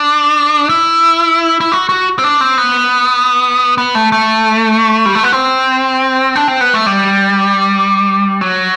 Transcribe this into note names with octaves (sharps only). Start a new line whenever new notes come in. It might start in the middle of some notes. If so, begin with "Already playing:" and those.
Already playing: D4
E4
E4
F#4
F#4
C4
D4
C4
B3
B3
A3
A3
G3
A3
B3
C4
D4
C4
B3
A3
G3
F#3